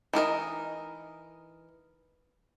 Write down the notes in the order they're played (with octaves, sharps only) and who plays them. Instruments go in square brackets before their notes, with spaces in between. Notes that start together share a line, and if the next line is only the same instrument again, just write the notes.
[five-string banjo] E3 D#4 A#4 D#5